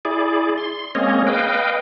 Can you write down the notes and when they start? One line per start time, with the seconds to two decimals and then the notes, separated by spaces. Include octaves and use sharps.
0.05 E4 G#4 D5
0.58 C6
0.95 G#3 A#3 C4 C#4 C#5 D#5
1.27 B4 D#5 F5 G5